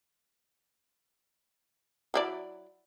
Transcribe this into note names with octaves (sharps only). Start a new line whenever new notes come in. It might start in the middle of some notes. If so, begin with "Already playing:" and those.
F#3 E4 D5